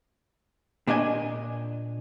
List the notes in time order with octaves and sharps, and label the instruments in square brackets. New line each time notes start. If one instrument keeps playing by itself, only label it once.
[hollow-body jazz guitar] A#2 D4 D#5 G#5